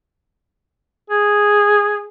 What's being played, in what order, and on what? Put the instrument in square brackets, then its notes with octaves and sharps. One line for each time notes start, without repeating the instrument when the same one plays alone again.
[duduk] G#4